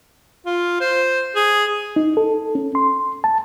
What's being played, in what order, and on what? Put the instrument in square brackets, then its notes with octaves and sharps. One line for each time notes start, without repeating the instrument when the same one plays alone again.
[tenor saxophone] F4
C5
G#4
[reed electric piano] D#4
A4
C#4
C6
A5